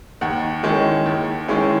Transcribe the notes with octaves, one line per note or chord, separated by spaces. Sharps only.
D#2 F#5
D#3 G#3 C#4 E4
D#2
D#3 G#3 C#4 E4